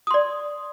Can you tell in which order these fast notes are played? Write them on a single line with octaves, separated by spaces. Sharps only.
D#6 C6 D5